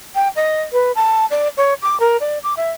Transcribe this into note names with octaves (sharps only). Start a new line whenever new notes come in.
G5
D#5
B4
A5
D5
C#5
D6
A#4
D5
D6
E5